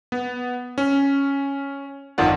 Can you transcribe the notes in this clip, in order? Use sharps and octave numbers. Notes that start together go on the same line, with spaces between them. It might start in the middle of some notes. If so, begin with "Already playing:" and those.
B3
C#4
G1 F2 D#3 F4 D5 F#5